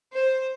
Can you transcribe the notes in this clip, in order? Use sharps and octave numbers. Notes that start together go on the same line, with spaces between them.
C5